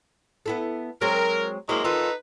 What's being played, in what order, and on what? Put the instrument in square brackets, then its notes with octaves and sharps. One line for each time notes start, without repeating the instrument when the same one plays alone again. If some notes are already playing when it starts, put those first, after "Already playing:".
[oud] B3 E4 A4
[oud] F#3 G#3 C4 [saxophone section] A#4
[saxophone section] F#3 G#3 A#3 [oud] C4 E4
[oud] D#3 F4 [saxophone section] D#4 A4 B4